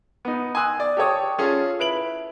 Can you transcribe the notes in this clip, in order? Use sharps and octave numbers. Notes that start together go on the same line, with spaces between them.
B3 D#4
G#5 C6 D#6 E6 F#6
D5
G4 A4 C#5 D#6
C#4 F4 G#4 A4
E4 B4 D7 F#7